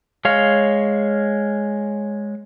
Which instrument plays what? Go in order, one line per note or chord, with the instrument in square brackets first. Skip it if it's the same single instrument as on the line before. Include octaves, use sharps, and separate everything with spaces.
[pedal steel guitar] G#3 C#5 F5